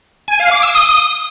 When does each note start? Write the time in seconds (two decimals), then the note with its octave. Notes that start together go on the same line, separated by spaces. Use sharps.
0.28 G#5
0.40 F5
0.51 D6
0.63 E6
0.75 D#6